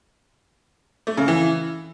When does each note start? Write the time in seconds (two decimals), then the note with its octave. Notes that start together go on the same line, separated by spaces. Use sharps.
1.07 A3
1.17 C#3
1.28 E3